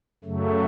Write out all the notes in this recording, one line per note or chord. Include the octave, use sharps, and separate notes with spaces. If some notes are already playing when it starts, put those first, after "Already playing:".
F#2 C#3 F#3 A3